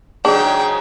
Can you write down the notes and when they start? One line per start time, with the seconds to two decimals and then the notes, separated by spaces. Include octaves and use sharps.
0.25 G#2 C#3 F#3 D4 G#4 G5